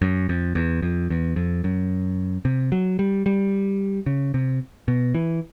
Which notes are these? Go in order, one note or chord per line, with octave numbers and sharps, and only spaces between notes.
F#2
F2
E2
F2
E2
F2
F#2
C3
F#3
G3
G3
C#3
C3
B2
E3